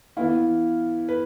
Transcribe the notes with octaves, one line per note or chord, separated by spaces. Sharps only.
E3 B3 E4 F5
B4